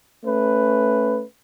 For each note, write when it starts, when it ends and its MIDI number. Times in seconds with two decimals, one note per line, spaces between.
0.24 1.23 57
0.24 1.23 61
0.24 1.23 71